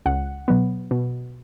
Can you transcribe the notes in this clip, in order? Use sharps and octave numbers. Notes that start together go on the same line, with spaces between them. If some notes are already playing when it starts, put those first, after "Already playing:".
C#2 F#5
B2 F#3 B3
B2